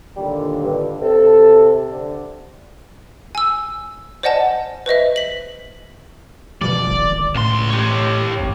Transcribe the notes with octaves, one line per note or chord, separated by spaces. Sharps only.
D#2 A#2 D3 G3
G2
C3 A4
D3
G#5 E6
C5 D5 D#5 F#5 G#5 A5
B4 C5 D#5 E5
B6 F#7
B2 F3 G3 D5
D1 G#1
C#2 A2 C6
G4 C#5
G#1 F2 G#2